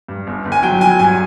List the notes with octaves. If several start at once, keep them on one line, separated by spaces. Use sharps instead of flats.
G2
G1
G1
G#5
F#3 G5
F#3 G#5
G2 G#5